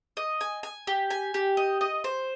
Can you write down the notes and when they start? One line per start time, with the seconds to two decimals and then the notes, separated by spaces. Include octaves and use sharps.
0.17 D#5
0.41 G#5
0.63 G#5
0.87 G4
1.10 G#5
1.34 G4
1.57 D#5
1.81 D#5
2.04 C5